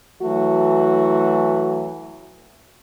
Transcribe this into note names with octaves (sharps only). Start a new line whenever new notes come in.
E3 F#3 A3 F#4